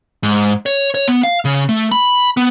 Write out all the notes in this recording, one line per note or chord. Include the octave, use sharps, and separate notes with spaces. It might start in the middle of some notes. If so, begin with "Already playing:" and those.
G#2
C#5
C#5
B3
F5
C#3
A3
B5
B3